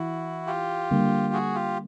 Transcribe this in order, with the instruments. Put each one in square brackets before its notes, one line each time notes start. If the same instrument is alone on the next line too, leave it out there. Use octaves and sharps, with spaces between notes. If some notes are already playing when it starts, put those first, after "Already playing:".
Already playing: [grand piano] E3 [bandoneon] E4 F#4
[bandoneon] F4 G4
[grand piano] D3 G3 A#3
[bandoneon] F#4 G#4
F4 G4